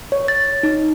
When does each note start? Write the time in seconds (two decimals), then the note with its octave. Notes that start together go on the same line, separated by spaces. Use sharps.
0.12 C#5
0.28 A6
0.63 D#4